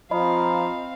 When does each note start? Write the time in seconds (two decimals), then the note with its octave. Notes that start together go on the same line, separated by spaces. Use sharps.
0.11 F3 C4 F4 D#5 F5 A#5 B5